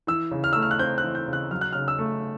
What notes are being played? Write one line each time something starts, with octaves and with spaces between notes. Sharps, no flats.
E3 E6
C#3
F6
A3 E6
F6
F#6
C4 G6
F#6
E3
G6
C#3
F#6
F#3 F6
F#6
C#3 F6
E6
A3